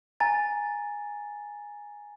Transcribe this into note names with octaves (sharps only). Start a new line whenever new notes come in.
G#5 A#5 A6